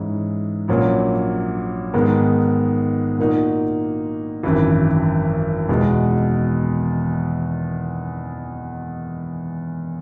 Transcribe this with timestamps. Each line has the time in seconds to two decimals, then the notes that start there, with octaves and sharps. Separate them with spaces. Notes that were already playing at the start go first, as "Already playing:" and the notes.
Already playing: G#2 E3 G#3 C#4
0.68 A#1 A#2 F#3 C#4
1.94 G#2 D#3 G#3 B3
3.19 A#2 A#3 D#4 F#4
4.43 G#1 F#2 E3
5.69 E2 B2 G#3